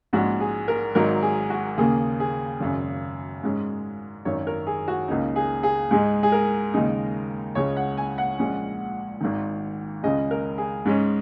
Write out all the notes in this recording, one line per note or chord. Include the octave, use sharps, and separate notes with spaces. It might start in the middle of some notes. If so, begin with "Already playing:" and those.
A#1 G#2 G#3 C#4 F#4
G#4
A#4
G#1 G#2 F#3 D#4 A#4
G#4
F#4
D#2 C#3 A#3 G#4
G#4
G#1 F#2 C#3
G#2 G#3 C#4
G#1 F#2 D#3 C#5
A#4
G#4
F#4
C#2 C#3 A#3 D#4
G#4
G#4
G#2 G#3 D#4 G#4
G#4
A#4
D#2 C#3 G#3 D#4
C#2 C#3 G#3 C#5
F#5
G#5
F#5
A#1 A#2 G#3 C#4
G#1 G#2 D#3
C#2 C#3 G#3 C#4 D#5
A#4
G#4
G#2 G#3 C#4